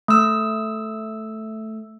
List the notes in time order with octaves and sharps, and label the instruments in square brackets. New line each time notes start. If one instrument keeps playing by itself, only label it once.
[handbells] A3 E6